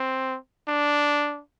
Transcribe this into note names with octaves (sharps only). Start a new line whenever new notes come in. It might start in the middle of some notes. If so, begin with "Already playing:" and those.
Already playing: C4
D4